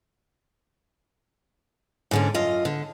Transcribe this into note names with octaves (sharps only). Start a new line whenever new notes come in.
G#2 D3 C#4
F#2 F4 D#5
D3